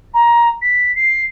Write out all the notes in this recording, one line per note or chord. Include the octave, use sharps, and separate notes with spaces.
A#5
B6
C7